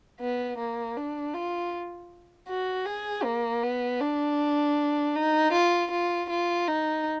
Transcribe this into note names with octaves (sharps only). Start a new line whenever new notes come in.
B3
A#3
D4
F4
F#4
G#4
A#3
B3
D4
D#4
F4
F4
F4
D#4